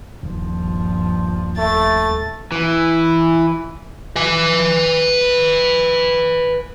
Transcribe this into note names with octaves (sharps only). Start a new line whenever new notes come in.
D#1 G2 F3
A3 A6
E3
B4 G#5